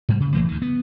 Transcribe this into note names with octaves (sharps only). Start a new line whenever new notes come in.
G#2 G3
C#3
A#1 E3 A3 A#3
D2 D#3
B3